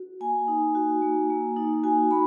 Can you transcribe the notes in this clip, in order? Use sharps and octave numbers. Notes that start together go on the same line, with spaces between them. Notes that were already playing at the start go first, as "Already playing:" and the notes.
Already playing: F#4
A#3 G#5
D#4
F#4
A#3
A#3
D#4
F#4 G#5
A#3 B5